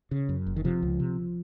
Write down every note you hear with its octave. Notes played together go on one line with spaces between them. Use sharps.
C#3
F#2
F#1
D#3
C3 F3
C#2
C3